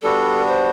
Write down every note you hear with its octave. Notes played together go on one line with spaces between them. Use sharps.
G3 B3 D4 F#4 A4
C5